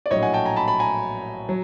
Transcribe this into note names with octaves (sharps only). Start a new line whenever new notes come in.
D5
A#1 A2 F#3 C#5 D#5
F#5 G#5
G5 A5
G#5 A#5
A5 B5
A5 B5
G#5 A#5
F#3